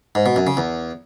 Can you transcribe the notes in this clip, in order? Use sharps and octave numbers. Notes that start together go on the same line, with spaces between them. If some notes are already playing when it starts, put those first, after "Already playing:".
G#2
B2
F#2
C#3
E2